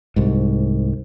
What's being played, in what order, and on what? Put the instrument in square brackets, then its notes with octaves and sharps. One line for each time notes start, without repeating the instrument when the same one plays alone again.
[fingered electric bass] C2 G#2